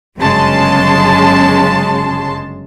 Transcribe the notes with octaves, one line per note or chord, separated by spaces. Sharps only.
G1 F#2 C#3 G#3 A5 C6